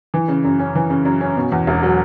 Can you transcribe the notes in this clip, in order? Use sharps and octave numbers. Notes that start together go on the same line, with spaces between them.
E3
C#3
F#2
C#4
E3
C#3
F#2
C#4
B2
E2
E1
F#3